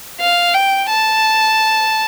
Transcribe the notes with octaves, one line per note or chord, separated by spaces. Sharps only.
F5
G5
A5